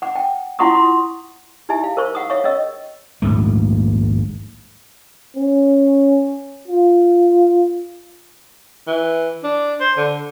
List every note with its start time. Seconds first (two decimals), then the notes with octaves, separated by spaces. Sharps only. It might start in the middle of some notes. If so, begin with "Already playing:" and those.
0.02 F#5 D6
0.15 G5
0.59 E4 F4 F#5 C6 C#6 D#6
0.74 C6
1.69 D#4 E4 G4 E5 G#5
1.84 F5
1.97 A#4 C5 C#6
2.15 F5 F#5 D#6
2.30 C#5 E5 F5 C#6
2.44 C#4 C#5 D#5 E6
3.22 D#1 A#1 G#2 A3
5.36 C#4
6.68 F4
8.87 E3
9.44 D4
9.80 C5
9.97 D3